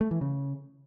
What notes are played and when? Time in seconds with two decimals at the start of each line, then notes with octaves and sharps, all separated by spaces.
0.01 A3
0.11 E3
0.21 C#3